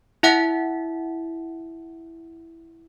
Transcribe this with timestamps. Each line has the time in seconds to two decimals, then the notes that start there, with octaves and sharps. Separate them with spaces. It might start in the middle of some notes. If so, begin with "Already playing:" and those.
0.23 E4 E5 F#5